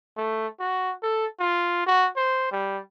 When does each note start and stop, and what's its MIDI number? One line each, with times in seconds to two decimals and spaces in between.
0.17 0.47 57
0.60 0.93 66
1.03 1.26 69
1.40 1.85 65
1.87 2.07 66
2.16 2.47 72
2.52 2.80 55